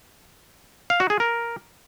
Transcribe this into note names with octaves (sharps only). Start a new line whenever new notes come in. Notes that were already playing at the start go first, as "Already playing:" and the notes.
F5
F#4
G#4
A#4